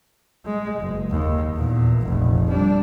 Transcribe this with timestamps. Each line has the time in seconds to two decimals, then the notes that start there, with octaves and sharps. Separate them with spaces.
0.46 G#3
0.80 F#1
1.10 D#2
1.55 E2 A#2
1.98 F1 A#1
2.50 G3 D4